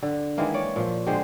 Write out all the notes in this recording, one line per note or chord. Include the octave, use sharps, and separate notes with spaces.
D3
D#3 E3 G#3 A#3
C#5 D5
A#2 F3
D3 G#3 G4 C5